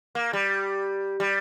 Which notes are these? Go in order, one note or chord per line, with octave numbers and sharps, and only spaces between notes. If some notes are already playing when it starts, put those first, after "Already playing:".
A#3
G3
G3